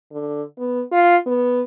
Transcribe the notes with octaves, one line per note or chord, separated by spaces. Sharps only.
D3
B3
F4
B3